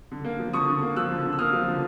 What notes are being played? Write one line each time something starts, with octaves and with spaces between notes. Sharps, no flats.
D3
A#3
F3
D3 C#6 D#6
D3
A#3
F3 E6 F#6
D3
D3
E6
A#3 D#6 F6
F3
D3